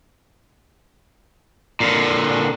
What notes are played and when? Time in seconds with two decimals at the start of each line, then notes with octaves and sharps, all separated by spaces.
1.80 A#2 D3